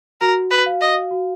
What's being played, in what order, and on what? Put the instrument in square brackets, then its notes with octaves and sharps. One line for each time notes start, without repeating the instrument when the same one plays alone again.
[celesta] F#4 [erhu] A#4
[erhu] B4
[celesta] F5
[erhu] D#5
[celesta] F#4